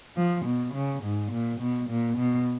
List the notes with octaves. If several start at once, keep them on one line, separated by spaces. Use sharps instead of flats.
F3
B2
C#3
G#2
A#2
B2
A#2
B2